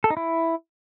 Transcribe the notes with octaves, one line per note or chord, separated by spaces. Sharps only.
A4
D#4
E4